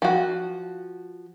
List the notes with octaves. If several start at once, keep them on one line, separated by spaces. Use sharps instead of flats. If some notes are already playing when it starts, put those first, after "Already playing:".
F3 F#4